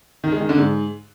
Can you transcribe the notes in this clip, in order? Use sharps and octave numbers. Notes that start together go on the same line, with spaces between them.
D#3
G#3
D#3
D3
G#2